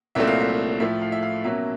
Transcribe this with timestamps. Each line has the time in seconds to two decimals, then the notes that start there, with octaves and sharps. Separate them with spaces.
0.15 C2 A#2 F#3 A3 C4 E5
0.27 F5
0.40 E5
0.80 A2 F3 A3 E5
1.01 F5
1.12 E5
1.23 F5
1.44 B2 F#3 A#3 C#4 E5